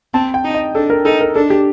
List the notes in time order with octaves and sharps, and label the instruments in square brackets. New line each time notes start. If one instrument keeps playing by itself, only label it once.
[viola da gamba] C4 [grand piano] A5
[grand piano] G5
[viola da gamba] D#4
[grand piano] D#5
[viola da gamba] D4 [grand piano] A4
[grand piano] A#4
[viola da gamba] D#4 [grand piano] A4
[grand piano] A#4
[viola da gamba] D4 [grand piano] A4
[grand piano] G4